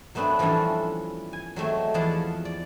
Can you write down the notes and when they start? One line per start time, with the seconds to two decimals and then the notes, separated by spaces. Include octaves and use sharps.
0.15 F#3 A3 B3 C4 D4 B4
0.39 E3 F3 G3 C#4 D4 A4
1.33 G#5
1.56 F#3 G#3 A3 C4
1.94 E2 F3 G#4 D5 F#5 A5
2.45 D5